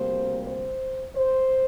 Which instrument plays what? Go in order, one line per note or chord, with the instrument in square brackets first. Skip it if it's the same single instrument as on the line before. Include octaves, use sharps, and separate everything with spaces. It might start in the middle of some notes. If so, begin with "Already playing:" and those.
Already playing: [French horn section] D2 C3 G3 A#3 C5
C5
C5